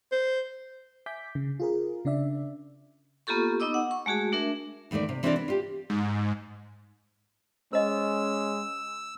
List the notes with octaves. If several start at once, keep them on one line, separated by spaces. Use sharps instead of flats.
C5
E5 G#5 D6 G6 B6
C#3
F4 G#4 A#4
C#3 D4 D5 E5
A#3 B3 F4 G4 A4 C#6
B3 D#4 D#5 D6 E6
F#5
C#6
G#3 A3 F#4 G#4 A5
A3 D4 A#4 E5
E2 D#3 A3 A#3 D5
C3
E3 C4 D4 G4 A#4 D5
B3
F4 G4
G#2
G#3 C#4 C5 D#5 E6